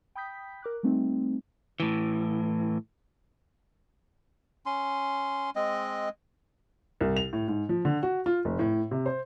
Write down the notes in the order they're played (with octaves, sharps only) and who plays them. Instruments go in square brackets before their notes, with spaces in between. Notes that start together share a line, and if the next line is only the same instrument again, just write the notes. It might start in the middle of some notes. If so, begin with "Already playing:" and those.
[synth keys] G5 B5 D#6 G6 B6
A#4 D6 F#6
G3 A3 C4 D#4
[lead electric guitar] A2 E3
[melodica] C#4 C6
G#3 C4 D#5
[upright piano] C2
F7
A2
G#2
F3
D3
F#4
F4
F1
A2
C3
C5